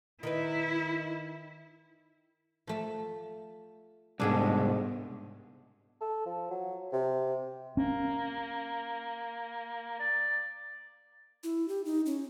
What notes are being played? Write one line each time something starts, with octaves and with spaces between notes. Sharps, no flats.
D#3 D#4 E4 B4
F3 A3 A5
C2 G#2 B2 D4 G#4 A4
A4
F3
F#3
C3
A#3 C#4
D5
E4
G4
D#4
C#4